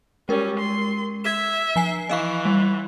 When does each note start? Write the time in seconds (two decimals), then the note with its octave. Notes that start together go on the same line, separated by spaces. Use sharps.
0.29 G3 G#3 C#4 A#4
0.58 C6
1.24 E5 G#6 B6 E7
1.76 F3 G#5 C7
2.09 E3 D#5 F5 C#6
2.45 G3